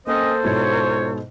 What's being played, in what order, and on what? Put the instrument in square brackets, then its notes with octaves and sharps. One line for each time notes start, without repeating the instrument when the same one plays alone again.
[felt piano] A#3 [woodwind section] C4 C#4 D#5 [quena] A4 [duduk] C5
[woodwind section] F2 F4 C#5 [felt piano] G#2 B2 E4